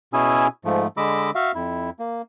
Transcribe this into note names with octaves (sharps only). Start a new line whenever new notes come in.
B2 C#4 E4 G#4 G#5 E6
G#2 F3 A3
D3 G#3 D#5 B5 D6 E6
F#4 E5 F5
F2 E4
A#3